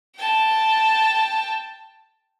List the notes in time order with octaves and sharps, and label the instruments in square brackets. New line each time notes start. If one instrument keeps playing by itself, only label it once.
[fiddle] G5 A5